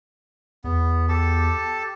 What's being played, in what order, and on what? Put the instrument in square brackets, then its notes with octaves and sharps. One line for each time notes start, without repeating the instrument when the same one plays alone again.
[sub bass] E2 [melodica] B3
[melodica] G4 A4 A5